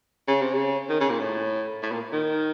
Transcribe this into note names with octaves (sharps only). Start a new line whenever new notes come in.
C#3
C3
C#3
D#3
C#3
A#2
A2
A2
A#2
D#3